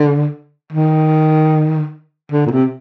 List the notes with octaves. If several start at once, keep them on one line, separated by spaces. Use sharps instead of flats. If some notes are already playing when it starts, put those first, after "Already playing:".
Already playing: D3
D#3
D3
A#2
C3